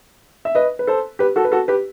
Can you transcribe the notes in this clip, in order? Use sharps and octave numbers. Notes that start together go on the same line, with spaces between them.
E5
B4 D#5
B4
A4 C5
G4 B4
F#4 A4
B4
F#4 A4
G4 B4